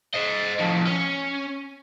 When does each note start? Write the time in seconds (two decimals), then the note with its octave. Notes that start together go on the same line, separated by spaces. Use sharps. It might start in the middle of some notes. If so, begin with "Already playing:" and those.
0.14 C5 D#5
0.60 A2 F3
0.86 C#4